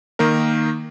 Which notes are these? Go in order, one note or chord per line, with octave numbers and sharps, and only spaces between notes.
D#3 A#3 D#4 A#4